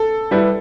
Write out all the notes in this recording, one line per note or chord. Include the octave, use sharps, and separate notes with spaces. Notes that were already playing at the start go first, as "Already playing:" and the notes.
Already playing: A4
G3 E4 G4 B4